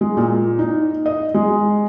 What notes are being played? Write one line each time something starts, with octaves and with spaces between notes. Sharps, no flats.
G#3
A#2
D#4
D#5
G#3